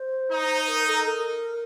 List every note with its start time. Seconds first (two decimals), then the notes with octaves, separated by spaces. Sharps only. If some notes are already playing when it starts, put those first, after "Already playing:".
Already playing: C5
0.32 D#4
0.68 A#4
0.87 A4
1.06 A#4